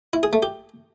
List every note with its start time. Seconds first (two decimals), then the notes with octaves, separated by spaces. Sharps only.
0.13 E4
0.23 G#4
0.33 A3
0.43 G4